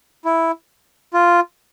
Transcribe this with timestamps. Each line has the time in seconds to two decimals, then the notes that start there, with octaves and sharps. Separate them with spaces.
0.25 E4
1.14 F4